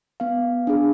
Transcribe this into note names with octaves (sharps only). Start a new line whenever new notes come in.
B3 F5
D4 G#4